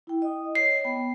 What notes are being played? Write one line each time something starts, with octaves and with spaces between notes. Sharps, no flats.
E4 G5
D#5 D#6
C#5 C7
B3 G5